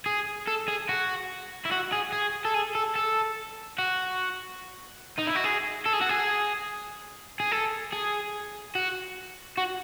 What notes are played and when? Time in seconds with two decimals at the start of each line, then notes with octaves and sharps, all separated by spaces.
0.06 G#4
0.47 A4
0.68 G#4
0.89 F#4
1.65 E4
1.71 F#4
1.92 G#4
2.13 G#4
2.45 A4
2.54 G#4
2.75 A4
2.96 A4
3.79 F#4
5.18 D#4
5.26 E4
5.35 F#4
5.44 G#4
5.86 A4
5.93 G#4
6.02 F#4
6.10 G#4
7.40 G#4
7.52 A4
7.93 G#4
8.75 F#4
9.58 F#4